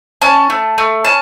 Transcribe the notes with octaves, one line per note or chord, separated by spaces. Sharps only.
C#4 A5
A3
A3
C#4 A5